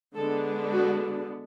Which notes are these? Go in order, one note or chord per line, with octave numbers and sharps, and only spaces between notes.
D3 G#3 B3 D4 A4
F#4